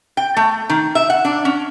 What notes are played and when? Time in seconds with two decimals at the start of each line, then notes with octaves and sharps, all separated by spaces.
0.17 G5
0.37 A3
0.70 D#3
0.95 E5
1.10 F#5
1.25 D4
1.45 C#4